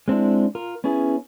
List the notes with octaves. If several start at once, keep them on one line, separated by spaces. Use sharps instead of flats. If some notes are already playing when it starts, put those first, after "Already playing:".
G#3 C4 D4 E4
F4 A#4
B3 C#4 E4 G#4